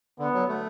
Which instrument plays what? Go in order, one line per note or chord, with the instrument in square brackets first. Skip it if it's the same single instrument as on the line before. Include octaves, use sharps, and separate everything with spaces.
[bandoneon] D3 [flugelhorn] B3
[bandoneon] F#3
A3